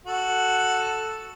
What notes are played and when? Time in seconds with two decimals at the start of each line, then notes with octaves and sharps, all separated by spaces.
0.06 F#4 A4